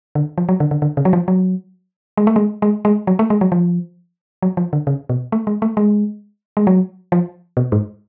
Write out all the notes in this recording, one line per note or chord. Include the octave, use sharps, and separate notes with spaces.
D3
F3
F#3
D3
D3
D3
C#3
F#3
F3
F#3
G#3
A3
G#3
G#3
G#3
F#3
A3
G#3
F#3
F3
F#3
F3
D3
C#3
B2
A3
G#3
A3
G#3
G#3
F#3
F3
B2
G#2